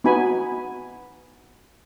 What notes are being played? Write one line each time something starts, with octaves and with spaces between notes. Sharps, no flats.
B3 D#4 F#4 G#5 B5